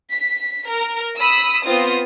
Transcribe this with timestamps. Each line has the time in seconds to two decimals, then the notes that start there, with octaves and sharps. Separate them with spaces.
0.11 B6
0.67 A#4
1.18 B5 D#6 E6
1.65 B3 C4 F4 D#6